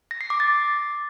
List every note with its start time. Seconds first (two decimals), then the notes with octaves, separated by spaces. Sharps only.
0.11 A#6
0.21 C7
0.30 D6
0.40 A6